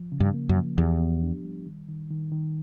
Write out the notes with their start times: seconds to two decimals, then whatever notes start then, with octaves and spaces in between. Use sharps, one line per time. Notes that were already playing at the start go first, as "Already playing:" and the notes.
Already playing: F3
0.12 C#3
0.20 G2
0.34 A#3
0.49 F#2
0.56 F3
0.78 E2 G4
1.00 B3
1.22 D4
1.44 G3
1.66 D#3
1.88 D#3
2.10 D#3
2.32 D#3